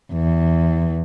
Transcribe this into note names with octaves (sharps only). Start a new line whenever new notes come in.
E2